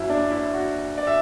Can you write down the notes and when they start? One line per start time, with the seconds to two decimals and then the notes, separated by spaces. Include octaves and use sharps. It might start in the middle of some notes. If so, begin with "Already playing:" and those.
Already playing: F#1 F#2 F#3 E4
0.09 D4
0.31 E4
0.53 F#4
0.98 D5
1.07 E5